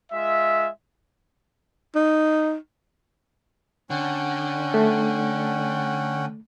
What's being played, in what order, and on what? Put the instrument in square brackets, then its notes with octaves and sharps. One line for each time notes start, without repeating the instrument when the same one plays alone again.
[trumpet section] G#3 F4 E5
[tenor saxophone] D#4
[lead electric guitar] D3 [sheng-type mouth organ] C#4 F#5 G5
[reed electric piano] A3